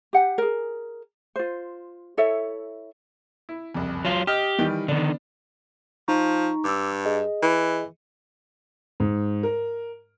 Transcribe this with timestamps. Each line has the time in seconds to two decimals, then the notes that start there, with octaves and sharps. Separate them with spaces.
0.13 G4 F#5 G5
0.38 G#4 A#4
1.36 F4 C5
2.17 E4 A4 C#5 E5
3.49 E4
3.75 F#1 C2 F2
4.05 F#3 F4 C6
4.27 G4 D#5 F6
4.59 D#3 E3 G3
4.88 D3 D#3 B3 D4
6.08 F3 D#4 A#5 C#6
6.64 G2 D6 E6
7.06 G#4 D#5
7.42 E3
9.00 G#2
9.43 A#4